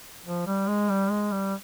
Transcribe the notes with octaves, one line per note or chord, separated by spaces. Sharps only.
F3
G3
G#3
G3
G#3
G3